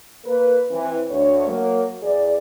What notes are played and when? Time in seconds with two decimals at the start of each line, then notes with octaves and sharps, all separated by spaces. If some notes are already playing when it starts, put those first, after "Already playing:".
0.25 A#3 A#4 B4
0.71 E3 C4
1.10 D2 C#5
1.48 F#3 A#3
2.02 E2 G#4 D5